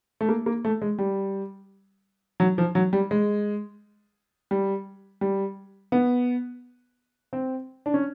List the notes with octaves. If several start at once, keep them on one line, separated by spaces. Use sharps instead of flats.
A3
A#3
A#3
A3
G#3
G3
F#3
F3
F#3
G3
G#3
G3
G3
B3
C4
D4
C#4